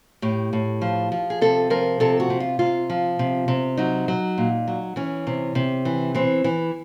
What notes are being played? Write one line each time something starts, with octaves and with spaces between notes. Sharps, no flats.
A2 G4
A2
F3
F3
G#4
C3 A4
F3 A#4
C3 A4
F#4
C3
F4
C3 F4
F3
C3
C3
F#3 D#4
F#3
A#2
F#3
E3 C#4
C3
C3
E3
E3 C4
E3